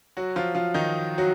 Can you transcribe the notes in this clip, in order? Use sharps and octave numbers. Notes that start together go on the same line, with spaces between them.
F#3 F#4
F3 F4
F3 F4
D#3 D#4
F#3 F#4